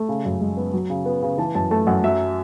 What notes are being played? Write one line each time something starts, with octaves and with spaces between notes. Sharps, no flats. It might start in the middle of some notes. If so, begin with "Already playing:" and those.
Already playing: A3
C#3
F#2
G#3
B3
F#3
C#3
B3
C#3
E3 A5
F#2 A5
A3 A5
F#2 F#5
F#3 E5